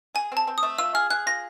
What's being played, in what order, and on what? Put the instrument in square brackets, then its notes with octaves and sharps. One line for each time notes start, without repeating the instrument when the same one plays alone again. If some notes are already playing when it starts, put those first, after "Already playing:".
[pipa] G#4 [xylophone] G#5
[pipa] C4
[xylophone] A5
[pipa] C4
[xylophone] D#6
[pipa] A3
[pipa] F4 [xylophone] E6
[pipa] G#4 [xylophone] F6
[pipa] G#4 [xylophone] F#6
[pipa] F4 [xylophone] A#6